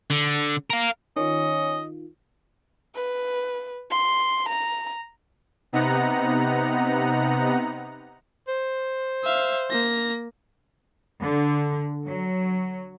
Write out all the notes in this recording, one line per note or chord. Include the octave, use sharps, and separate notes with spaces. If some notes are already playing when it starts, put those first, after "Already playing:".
D3
A#4 F5
D#3 C#4 F4 D#5
B4
C6
A#5
C3 B3 D#4 F#5 A#5
C5
E5 F5
A#3 A#6
D3
F#3